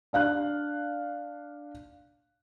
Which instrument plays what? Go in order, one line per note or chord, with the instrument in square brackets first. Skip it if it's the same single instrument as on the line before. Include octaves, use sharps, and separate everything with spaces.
[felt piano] D4 F5 F#6